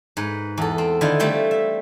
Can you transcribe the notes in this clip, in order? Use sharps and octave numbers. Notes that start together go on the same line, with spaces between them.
G#2 B4
E2 A4
C4
D3 D#3 E4 F4
G3 A3 C4 A4 G5
E5